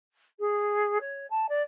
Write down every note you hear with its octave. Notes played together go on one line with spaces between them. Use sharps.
G#4
C#5
A5
D5